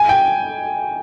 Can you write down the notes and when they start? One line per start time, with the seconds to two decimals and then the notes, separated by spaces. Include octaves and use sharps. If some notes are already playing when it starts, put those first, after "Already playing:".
Already playing: G#5
0.09 G5